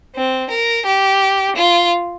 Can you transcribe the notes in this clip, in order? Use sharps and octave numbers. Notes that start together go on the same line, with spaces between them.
C4
A#4
G4
F4